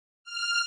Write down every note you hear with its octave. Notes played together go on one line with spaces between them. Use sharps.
F6